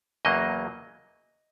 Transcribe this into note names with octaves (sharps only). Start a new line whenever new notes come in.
E2 C#3 F#3 A#3 D#5